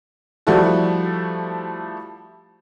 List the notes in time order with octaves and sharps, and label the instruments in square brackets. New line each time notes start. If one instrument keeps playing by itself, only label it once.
[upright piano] F3 G3 A3 E4 F#4 A4